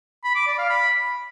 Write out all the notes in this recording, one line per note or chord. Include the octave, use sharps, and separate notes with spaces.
B5
D6
D5
F5
B5